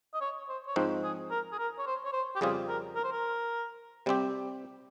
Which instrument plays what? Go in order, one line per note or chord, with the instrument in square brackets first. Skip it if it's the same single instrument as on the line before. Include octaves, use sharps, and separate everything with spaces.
[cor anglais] D#5
C#5
C5
C#5
[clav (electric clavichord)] G#2 F3 C4 D#4 [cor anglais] C5
[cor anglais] G#4
A#4
G#4
A#4
C#5
C5
C#5
C5
G4
[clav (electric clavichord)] F2 C#3 G3 C4 F4 [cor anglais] G#4
[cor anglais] A#4
A#4
C5
A#4
[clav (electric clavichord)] C3 G3 C4 G4